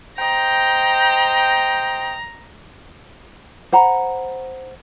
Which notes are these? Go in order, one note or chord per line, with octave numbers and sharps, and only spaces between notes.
C5 D#5 G5 A#5
C5 F#5 A#5 B5